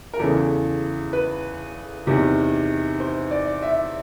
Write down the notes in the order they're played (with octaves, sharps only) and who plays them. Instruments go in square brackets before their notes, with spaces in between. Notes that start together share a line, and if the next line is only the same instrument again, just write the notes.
[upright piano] A#4
E2 C#3 E3 A4
B4
E2 C3 D#3
C5
D5
E5